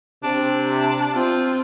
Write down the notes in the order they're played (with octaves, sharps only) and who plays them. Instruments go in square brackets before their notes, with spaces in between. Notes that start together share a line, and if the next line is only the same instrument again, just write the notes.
[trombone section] C3 [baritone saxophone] D4
[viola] C4 F4